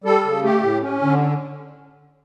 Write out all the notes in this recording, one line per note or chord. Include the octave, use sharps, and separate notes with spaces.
G3 A4
C#3
A3 G4
A2
C#4
D3